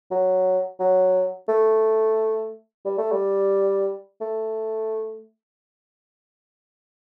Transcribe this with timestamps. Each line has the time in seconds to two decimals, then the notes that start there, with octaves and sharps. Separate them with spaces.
0.11 F#3
0.80 F#3
1.48 A3
2.85 G3
2.98 A3
3.12 G3
4.21 A3